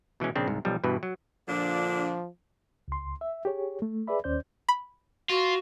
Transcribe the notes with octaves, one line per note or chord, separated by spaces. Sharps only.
B2 E3 G#3 C#4
A#1 C#3 C4 D4
C2 G#2
B1 F3 G3
G2 B2 E3 B4
F#3
A#2 D3 F3 D4
C#2 C6
E5
G4 G#4 C#5
A3
G#4 B4 D5 E5 B5
D#2 C#4 C5 D5 G6
B5
F4 F#4